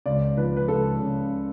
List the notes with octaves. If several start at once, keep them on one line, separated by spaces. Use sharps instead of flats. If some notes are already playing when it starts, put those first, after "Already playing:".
C#2 D5
F3 B4
B4
C#2 A4
C#3